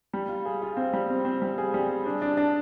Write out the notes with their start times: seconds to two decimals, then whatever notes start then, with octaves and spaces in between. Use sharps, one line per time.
0.13 G3
0.29 F4
0.45 G#4
0.62 F4
0.77 C4
0.93 G3
1.10 C4
1.25 C4
1.42 G3
1.58 G#4
1.74 G3
1.90 G#4
2.06 D4
2.22 D4
2.37 D4